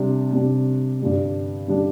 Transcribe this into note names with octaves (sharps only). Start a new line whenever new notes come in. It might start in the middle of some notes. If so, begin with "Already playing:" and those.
Already playing: C3 G3 D4
C3 G3 D4
G2 D3 G3 D4
D3 G3 D4